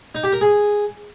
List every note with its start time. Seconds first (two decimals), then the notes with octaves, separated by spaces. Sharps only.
0.15 D#4
0.24 G4
0.32 A#4
0.41 G#4